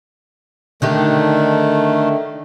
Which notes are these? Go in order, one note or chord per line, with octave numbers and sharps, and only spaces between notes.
D3 D#3 A3 D#4 G4